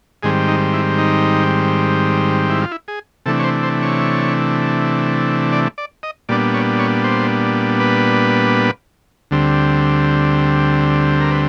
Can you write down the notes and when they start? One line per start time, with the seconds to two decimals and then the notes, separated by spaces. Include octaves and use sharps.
0.23 G#2 D#3 G3 C4 G#4
0.48 D#4
0.74 E4
0.98 D#4
2.50 E4
2.61 F4
2.71 E4
2.88 G#4
3.26 C3 E3 A3 D4 A4
3.39 C#5
3.44 C5
3.63 C5
3.82 C#5
5.52 D5
5.78 D5
6.03 D#5
6.29 A#2 G3 B3 D4 D5
6.54 C#5
6.79 C#5
7.04 C5
7.80 B4
9.31 D2 D3 G3 C4
11.21 A#4
11.31 B4